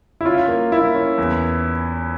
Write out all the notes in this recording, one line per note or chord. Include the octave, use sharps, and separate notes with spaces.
E4
C#4 F4
A#3
A#3 E4
C#4
E2